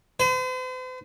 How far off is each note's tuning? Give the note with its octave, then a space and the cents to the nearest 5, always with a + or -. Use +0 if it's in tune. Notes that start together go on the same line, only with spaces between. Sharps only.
C5 -45